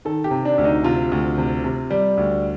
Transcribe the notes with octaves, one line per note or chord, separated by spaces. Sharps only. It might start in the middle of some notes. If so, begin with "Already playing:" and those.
D#3 A4
G4
C3
D4
D2
D#4
C3 F4
D2
C3
C3
G3
D2